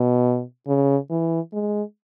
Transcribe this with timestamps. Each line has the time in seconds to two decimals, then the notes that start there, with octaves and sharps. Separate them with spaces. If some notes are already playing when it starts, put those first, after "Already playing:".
Already playing: B2
0.67 C#3
1.10 E3
1.53 G#3